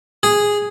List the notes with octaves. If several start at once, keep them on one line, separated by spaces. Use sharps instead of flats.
G#4